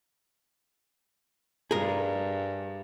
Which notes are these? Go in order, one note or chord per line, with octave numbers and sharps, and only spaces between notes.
G2 G#4 A#4